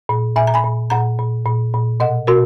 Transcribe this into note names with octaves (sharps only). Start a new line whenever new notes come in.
A#2
A#2 E5 G#5
A#5
G#5 B5
A#2
A#2 F#5 A#5
A#2
A#2
A#2
B2 D#5 F#5
B2 F#4 A#4